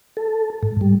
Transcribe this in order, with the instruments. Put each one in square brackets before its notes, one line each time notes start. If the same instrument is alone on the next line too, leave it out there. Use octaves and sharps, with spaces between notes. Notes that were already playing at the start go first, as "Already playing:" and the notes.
[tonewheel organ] A4
G#2
G3